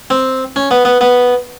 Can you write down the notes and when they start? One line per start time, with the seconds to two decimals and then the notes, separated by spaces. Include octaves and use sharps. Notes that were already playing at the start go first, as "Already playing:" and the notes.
0.10 C4
0.56 C#4
0.71 B3
0.85 B3
1.01 B3